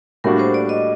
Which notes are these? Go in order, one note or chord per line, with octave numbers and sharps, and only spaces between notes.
A2 G3 A#3 D4 F#4 A#4
C5
D5
D#5